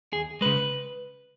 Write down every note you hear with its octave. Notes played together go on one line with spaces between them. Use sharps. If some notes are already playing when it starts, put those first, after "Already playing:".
D#2 G#4
C#3 G#3 B4